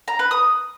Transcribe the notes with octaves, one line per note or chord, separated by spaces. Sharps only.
A#5
B4
D#6